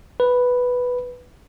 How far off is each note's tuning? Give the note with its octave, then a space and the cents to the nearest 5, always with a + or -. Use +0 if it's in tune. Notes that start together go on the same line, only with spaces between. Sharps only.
B4 +0